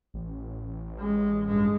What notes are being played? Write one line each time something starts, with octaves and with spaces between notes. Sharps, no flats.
A1
G#3
G2 G#3